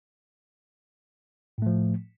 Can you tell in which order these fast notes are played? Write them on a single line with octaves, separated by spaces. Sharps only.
A2 A3 F3